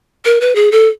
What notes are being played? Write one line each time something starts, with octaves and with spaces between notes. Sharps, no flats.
A#4
B4
G#4
A4